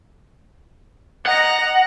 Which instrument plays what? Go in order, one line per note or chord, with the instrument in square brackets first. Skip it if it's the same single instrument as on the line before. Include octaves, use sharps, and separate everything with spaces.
[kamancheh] D#5 A#5 [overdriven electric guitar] F#5